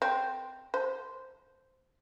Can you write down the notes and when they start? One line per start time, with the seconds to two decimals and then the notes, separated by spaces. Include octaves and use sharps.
0.02 C4
0.74 C5